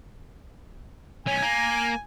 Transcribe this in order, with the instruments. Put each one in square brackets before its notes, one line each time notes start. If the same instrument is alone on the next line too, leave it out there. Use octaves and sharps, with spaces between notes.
[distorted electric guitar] B1 C#4 [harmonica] G#5
[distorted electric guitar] A#3